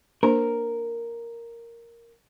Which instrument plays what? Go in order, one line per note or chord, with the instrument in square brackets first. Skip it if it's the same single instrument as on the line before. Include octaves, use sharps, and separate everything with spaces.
[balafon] A#3 D4 C5 [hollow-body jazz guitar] A#4